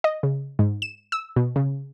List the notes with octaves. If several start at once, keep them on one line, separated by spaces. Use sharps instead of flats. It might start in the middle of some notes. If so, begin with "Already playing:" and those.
D#5
C#3
G#2
E7
E6
B2
C#3